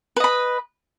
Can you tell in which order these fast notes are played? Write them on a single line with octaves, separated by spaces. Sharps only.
B4 D#5 B5